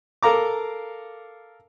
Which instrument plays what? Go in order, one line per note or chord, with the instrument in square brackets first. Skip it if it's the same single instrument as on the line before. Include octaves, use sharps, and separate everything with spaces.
[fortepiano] A4 A#4 F5 A#5 D6